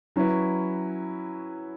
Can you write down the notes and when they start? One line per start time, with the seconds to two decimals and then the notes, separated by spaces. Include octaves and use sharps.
0.16 F#3 C#4 E4 B4